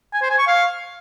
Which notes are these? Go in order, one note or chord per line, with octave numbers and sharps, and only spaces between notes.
G#5
C5
G#5
C#6
F5